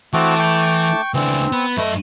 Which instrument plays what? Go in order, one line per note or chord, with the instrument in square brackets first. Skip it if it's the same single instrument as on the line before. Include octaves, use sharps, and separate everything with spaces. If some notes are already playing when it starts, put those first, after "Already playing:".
[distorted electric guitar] E3 [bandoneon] A3 A5 D6 [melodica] C4 F#4
[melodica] G5 C#6
[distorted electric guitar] C#2 D4 [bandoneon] E3 E6 [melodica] C4
[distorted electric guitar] B3 [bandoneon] B4
[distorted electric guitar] F#2 D#5 [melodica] A3